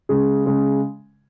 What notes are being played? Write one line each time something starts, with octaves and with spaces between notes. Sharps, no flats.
C#3 G#3 G#4
C#3 G#3